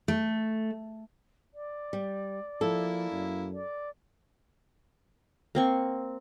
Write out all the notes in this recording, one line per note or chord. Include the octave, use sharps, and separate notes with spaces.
A3
D5
G3
F3 A#3 E4 A4
F#2
D5
A#3 C4 C#6